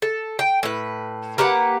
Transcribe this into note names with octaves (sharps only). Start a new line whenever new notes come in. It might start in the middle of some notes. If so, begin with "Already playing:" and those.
A4
G5
A2 B4
A#3 G4 B4 F#5